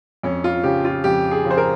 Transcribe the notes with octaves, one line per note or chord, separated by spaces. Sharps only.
F2 C#4
F4
C#3 F3 G4
F4
F2 G4
G#4
C#3 F3
C5
A#4